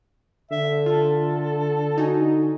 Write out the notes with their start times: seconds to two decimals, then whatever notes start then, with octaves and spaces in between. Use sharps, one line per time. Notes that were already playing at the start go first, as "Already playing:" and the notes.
0.51 D3 E5
0.86 F4 A4
1.98 D#4 F#4 G#5